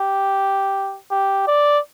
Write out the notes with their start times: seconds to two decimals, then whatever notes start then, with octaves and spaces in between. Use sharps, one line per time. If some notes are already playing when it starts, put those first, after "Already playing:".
Already playing: G4
1.11 G4
1.47 D5